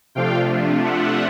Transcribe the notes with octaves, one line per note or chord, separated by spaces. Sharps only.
C3 F3 A3 D4 F4 F5 G5
E5 F#5